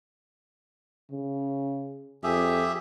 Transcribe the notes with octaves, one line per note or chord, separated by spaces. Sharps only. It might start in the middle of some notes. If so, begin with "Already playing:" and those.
C#3
F2 G4 G#4 E5